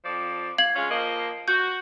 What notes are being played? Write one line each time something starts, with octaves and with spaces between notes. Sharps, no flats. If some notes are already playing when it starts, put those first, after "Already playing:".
F2 F3 D5
F5 G#6 F#7
G#3 C#4 F4
F3 A#3 D#5
F#4 G6